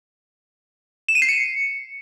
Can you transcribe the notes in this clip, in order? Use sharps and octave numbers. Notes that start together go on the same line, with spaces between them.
E7
D#7
C7
C#7